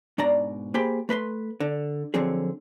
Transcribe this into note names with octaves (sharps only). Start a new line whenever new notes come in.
G#2 B2 D4 D5 A#5
A#3 G4 G#4 C5 B5 C6
A3 B4 B5 C6
D3
D3 F3 F#3 C4 G#4